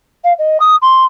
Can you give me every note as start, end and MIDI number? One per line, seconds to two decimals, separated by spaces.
0.24 0.33 77
0.39 0.57 75
0.60 0.74 87
0.82 1.04 84